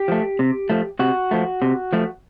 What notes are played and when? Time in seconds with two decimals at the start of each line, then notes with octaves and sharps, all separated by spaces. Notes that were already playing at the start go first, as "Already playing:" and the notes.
Already playing: G4
0.08 F3 A3
0.39 C3
0.70 F3 A3
0.99 C3 F#4
1.31 F3 A3
1.62 C3
1.93 F3 A3